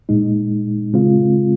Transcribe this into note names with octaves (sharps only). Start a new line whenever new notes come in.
A#2 G#3 D#4
C#3 G#3 C4 F4